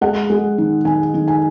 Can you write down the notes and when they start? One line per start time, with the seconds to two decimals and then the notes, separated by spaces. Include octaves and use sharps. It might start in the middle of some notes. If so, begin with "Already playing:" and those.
0.01 G#3 F#5
0.30 G#3
0.58 D#3
0.85 D#3 G#5
1.14 D#3
1.28 G#5